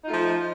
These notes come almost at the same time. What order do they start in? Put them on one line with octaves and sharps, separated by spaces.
D#4 F4 A3 F3